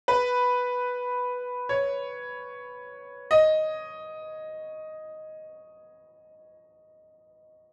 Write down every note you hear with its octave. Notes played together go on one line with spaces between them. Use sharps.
B4
C#5
D#5